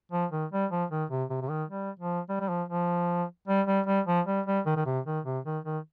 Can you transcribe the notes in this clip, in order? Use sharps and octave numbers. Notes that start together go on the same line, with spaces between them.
F3
D#3
G3
F3
D#3
C3
C3
C3
D#3
G3
F3
G3
G3
F3
F3
G3
G3
G3
F3
G3
G3
D#3
D#3
C3
D#3
C3
D#3
D#3